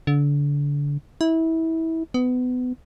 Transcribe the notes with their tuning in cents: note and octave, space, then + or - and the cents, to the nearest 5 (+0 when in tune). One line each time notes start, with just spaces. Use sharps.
D3 -30
E4 -25
B3 +25